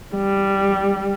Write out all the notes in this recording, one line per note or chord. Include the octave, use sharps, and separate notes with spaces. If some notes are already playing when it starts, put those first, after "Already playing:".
G3